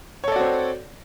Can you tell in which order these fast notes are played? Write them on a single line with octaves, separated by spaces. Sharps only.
C#5 A4 D5 F#4 C4